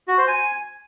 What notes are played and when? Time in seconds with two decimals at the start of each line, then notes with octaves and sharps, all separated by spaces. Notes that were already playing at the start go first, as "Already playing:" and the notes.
0.08 F#4
0.18 C5
0.28 G#5